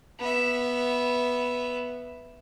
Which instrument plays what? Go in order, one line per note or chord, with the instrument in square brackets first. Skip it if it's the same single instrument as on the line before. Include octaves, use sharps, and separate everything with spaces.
[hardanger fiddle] B3 E5